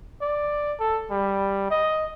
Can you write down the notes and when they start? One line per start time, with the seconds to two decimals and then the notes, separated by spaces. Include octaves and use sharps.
0.21 D5
0.80 A4
1.11 G3
1.70 D#5